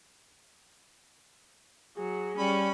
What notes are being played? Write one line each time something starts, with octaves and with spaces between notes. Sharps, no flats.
F#3 G#4
G3 C#4 B5